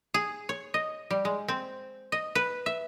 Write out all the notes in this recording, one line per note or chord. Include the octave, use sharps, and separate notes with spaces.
G#4
C#5
D#5
G3
G#3
C4
D#5
B4
E5